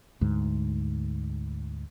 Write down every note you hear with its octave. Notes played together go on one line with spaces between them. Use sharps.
D2 G#2